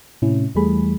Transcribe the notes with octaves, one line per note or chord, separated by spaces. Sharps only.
A2 C3 C#4 E4
E2 E3 G3 A3 G#4 B5